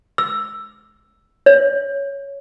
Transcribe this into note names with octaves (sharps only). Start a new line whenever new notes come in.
E6
C#5